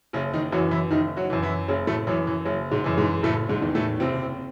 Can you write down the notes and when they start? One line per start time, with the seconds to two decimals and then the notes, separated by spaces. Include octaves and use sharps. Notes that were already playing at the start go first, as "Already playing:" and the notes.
0.13 F#1 C#3 C#4
0.34 D#3 D#4
0.52 F#2 E3 F#3 F#4
0.71 E3 E4
0.91 F#1 D#3 D#4
1.17 F#3 F#4
1.30 F#2 E3
1.42 E3 E4
1.68 F#1 C#3 C#4
1.87 A2 A3
2.07 F#2 E3 F#3
2.27 E3
2.45 F#1 F#3
2.71 G#2 G#3
2.84 F#2 E3
2.97 G#2 G#3
3.23 F#1 A2 A3
3.49 G#2 G#3
3.61 E2 D#3
3.75 A2 A3
4.00 F#1 C3 C4